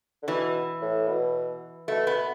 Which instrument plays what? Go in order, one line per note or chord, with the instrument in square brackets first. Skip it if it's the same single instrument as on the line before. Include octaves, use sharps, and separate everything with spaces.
[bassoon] D3
[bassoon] B2 [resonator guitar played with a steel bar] E3
[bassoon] A2
B2
[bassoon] B2 [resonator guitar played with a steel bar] A3
[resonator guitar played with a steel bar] B3